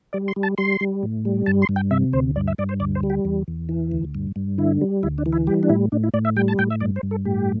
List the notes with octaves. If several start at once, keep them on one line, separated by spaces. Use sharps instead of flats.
G3 D5
C6
G3
A5
G3 C6
G3
A2
G3
G2 A5
C6
G2
G5
C3 E5
D2 C5
G2 D5
E5
G2 D5
C5
D2 D5
C5
G3
G4
E2
E2
E3
D2
G2
G2
D3 E4
G3
D2 E4
D4
E3
E4
G3 G4
D4
A2 E4
A2 D4
E4
A2 D5
E5
G3 G5
A5
A2 G5
E5
G2 D5
C5
G2
A4
A2 G4